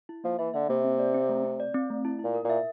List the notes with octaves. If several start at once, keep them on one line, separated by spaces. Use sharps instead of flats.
E4
F3 A#3
E3 E5
D3 E5
C3 A#3
C4
D5
C4
A3
C4
D5
C4
A3
E4
A#2 E4
A#4
A#2
E5